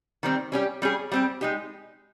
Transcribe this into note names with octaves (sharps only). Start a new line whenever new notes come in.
D#3 G3 C4
G3 C#4 G4
G3 C#4 G#4
G3 C4 G4
G#3 D#4 G4